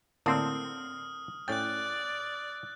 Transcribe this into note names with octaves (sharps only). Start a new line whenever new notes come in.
A2 D3 A#3 C4 A4 D#6 F6
A2 C#4 D5 G5 F#6 A6